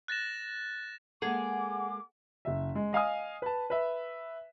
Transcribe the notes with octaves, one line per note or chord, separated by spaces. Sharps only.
F#6 A6 A#6 E7
G#3 A#3 G#4 A4 F#5 D6
F#1 E5
G#3
D#5 F5 G#5 D#6
B4 A5
B4 E5